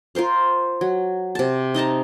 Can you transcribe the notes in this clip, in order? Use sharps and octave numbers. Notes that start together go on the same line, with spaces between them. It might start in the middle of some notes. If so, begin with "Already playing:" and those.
F4 A#4 C5 F5
F#3
C3 A5
D#4 D#5 A5 A#5